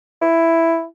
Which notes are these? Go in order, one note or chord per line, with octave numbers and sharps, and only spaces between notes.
E4